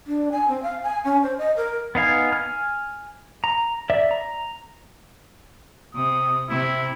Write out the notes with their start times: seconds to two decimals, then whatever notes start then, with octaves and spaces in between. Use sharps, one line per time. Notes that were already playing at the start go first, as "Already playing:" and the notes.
0.07 D4
0.32 G#5
0.48 C4
0.62 F5
0.83 G#5
1.04 C#4
1.23 C5
1.38 D#5
1.56 A#4
1.95 B3 D#4 F5 G#5
2.33 G#5 F6
3.44 A#5
3.90 D5 E5
4.11 A#5
5.94 C3 D#6
6.49 C3 E4